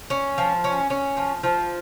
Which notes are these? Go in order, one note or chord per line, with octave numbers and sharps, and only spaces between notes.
C#4
F3
C#4
C#4
F3
F3